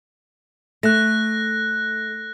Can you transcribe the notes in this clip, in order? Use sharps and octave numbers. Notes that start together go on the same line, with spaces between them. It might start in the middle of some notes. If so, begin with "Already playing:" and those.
A3 F#6 A#6